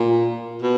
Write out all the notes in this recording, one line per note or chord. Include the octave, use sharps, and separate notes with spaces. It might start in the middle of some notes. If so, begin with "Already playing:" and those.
Already playing: A#2
B2